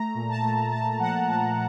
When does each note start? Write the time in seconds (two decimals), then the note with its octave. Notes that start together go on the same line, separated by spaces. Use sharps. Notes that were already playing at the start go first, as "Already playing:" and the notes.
Already playing: A3 A#5
0.14 A#2
0.29 A5
0.43 A3
0.72 A3 A5
0.99 F3 F#5
1.28 F3 A5